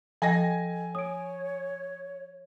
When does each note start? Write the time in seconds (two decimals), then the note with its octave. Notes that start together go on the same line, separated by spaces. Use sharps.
0.22 F3 A4 D#5 G5 G#5 A#6
0.95 C#5 D#6 D7